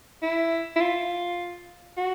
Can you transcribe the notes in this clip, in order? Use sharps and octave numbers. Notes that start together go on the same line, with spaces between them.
E4
E4
F4
F#4